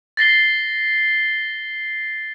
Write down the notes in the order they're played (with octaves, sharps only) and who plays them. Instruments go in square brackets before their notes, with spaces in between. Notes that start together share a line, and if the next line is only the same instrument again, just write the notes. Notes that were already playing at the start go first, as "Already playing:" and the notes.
[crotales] A6 A#6 C7 G7